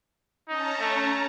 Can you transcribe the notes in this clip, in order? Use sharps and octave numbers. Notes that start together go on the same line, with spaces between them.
C#4 D#4 A5 A#5
A3